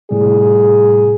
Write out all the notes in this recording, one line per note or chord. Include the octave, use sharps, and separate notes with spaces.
A2 C3 G3 G#4